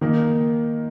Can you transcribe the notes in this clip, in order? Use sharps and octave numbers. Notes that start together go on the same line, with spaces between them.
D#3 A#3 D#4